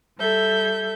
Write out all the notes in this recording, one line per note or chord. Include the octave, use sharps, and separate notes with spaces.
G3 A4 E5 G6